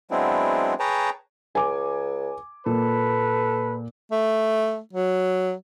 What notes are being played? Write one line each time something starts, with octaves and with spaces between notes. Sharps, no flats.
F#3 G#3 B3 C4 D4 E4
G#4 B4 C#5 G5 A5 A#5
C#2 G#5 D6
A#2 A4 B4
A3
F#3